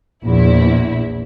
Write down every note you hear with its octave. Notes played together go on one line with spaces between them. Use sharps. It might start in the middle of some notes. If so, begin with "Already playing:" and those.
A#1 E2 E4